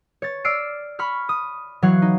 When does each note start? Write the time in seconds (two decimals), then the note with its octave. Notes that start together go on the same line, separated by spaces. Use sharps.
0.22 C#5 A6
0.45 D5 E6 F6 C7 D7
0.99 B5 C#6 F6
1.29 D#6
1.82 E3 F#3 C#5 F5 F#5
2.02 D#4